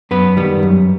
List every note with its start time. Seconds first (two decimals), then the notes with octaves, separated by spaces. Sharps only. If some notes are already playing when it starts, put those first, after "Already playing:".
0.11 F#2 B3 B4
0.37 D#3 G3 B3
0.63 F#2